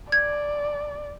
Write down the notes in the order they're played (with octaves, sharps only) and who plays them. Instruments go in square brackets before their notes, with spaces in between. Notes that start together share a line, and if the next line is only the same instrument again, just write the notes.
[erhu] D5 [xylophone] G#6